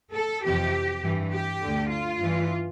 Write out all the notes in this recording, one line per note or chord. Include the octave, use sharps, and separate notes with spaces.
A4
F2 C3 E3 G4
G2 E3
G4
D2 D3
F4
G2 E3